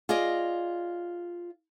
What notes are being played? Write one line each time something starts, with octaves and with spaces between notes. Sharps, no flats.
F4 G#4 D5 D#5